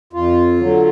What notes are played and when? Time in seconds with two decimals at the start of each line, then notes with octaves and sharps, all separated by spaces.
0.13 F2 F4
0.59 D3 F#3